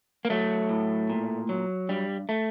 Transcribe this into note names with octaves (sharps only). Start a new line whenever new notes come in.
A#3
F#3 A3
A2
A#2
F#3
G2 G3
A3